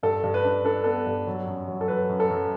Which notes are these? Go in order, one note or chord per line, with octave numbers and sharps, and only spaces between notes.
G2 A4
G2
B4
D4
D4 A4
B3 A4
G2
F#3
F#2
F#3
A4
F#3 B4
F#2
A4
F#2